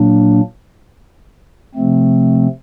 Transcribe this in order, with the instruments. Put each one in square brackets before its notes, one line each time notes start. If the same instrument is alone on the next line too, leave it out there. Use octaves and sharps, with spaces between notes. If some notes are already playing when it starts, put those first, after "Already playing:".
Already playing: [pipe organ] A#2 F#3 A#3 D4
C3 F3 A3 C4